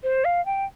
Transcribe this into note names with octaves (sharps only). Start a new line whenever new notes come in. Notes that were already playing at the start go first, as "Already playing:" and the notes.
C5
F5
G5